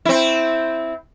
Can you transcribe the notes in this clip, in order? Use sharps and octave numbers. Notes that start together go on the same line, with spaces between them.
C4 E4